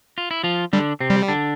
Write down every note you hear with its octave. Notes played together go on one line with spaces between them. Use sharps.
F4
E4
F3 F4
D3 G3 D4
C3 C4
G3
D3 D4